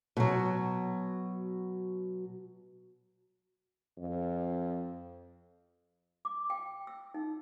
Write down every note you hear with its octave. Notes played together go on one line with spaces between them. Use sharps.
B2 F#3
F2
D6
G5
E6
D#4